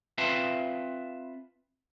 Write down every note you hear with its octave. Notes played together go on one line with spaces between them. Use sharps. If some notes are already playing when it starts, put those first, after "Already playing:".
C4 F4 B4 E5 F5 A5